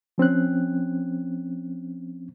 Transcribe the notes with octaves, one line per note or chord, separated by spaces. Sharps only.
F3 C4 C#4 F#6